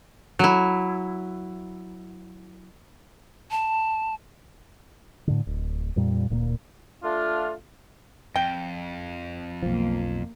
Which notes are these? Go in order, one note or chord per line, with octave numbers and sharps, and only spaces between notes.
F#3 E4
A5
A2 D3
D1
F2 A#2 G3
D1 A#2 G#3 A#3
A3 D4 F4
F2 G5
B1 F3 A#3